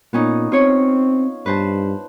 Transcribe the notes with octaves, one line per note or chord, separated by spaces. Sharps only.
A#2 B3 C#4 D#4
C4 F4 C#5
G2 B4 C5 A5